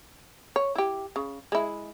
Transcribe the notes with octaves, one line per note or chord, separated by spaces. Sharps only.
C#5
E4 G4
C#3
G#3 E4